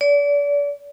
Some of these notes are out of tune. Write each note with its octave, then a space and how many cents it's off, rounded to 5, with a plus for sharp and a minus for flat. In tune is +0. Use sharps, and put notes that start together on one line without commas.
D5 -35